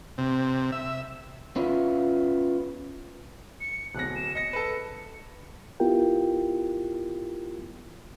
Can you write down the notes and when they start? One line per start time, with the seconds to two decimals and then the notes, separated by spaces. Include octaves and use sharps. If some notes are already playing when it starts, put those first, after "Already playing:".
0.18 C3
0.72 E5
1.56 B3 C#4 E4 F4
3.61 C#7
3.95 D1 B1 F#6 A#6
4.15 E7
4.35 D#5 A#6 C#7
4.53 A4 B4
5.80 B3 E4 F4 G4 A#4 G5